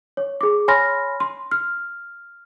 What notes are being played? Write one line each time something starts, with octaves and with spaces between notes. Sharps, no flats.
C#5
G#4 D6
C#5 G#5 B5 C6 F6 A#6
C6
F6